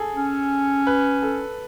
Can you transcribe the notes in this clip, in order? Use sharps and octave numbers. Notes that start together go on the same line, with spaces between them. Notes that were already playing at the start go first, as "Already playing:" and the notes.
Already playing: G#4 A4
C#4
B4
A4